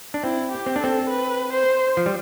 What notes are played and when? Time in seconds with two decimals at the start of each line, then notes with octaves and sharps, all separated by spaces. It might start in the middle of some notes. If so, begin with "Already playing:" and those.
0.14 D4
0.23 C4 E4
0.52 G4
0.66 C4
0.76 D4
0.81 C4 A4
1.10 B4
1.53 C5
1.97 F3
2.06 G3